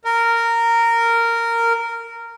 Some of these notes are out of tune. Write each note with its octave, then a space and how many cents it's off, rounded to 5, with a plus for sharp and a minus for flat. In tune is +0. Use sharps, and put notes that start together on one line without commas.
A#4 -10